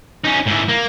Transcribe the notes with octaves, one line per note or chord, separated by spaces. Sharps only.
C#4 D#4
G#2 E3
A#3